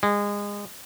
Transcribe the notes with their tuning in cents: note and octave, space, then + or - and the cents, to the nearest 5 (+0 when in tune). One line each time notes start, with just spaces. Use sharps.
G#3 -25